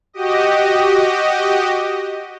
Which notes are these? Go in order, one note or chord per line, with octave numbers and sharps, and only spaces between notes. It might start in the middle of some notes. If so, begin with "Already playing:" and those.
F#4 G4 D#5